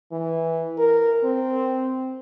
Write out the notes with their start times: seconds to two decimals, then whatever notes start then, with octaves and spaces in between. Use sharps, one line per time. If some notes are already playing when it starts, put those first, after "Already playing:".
0.12 E3
0.78 A#4
1.24 C4